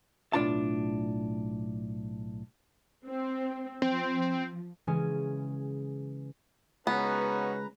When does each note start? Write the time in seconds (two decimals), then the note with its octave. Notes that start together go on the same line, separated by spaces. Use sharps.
0.33 B1 A2 D4 F4 A5
3.06 C4
3.82 F3 C4
4.87 C#3 E3 G#3 C#4 G#4
6.87 C#2 B3 C#4 D#4 F#4 B4 A#5